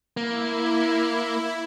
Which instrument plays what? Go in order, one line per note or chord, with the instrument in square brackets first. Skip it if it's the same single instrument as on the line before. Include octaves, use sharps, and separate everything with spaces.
[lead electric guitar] A#3 [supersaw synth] E4